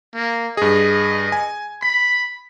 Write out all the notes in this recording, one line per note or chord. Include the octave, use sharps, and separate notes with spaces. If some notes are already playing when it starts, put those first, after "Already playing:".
A#3
G2 G#4 D#5
G#5
B5 B6